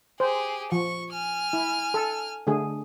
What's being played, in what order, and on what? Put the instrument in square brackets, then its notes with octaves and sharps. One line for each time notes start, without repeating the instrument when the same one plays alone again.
[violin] G4 G#4 [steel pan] C5
[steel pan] F3 [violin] C#6
[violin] G#5 F6
[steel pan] E4
A4
D3 A3 G#4